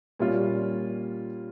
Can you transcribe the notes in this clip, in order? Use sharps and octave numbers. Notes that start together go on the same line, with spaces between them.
A#2 G3 C#4 F4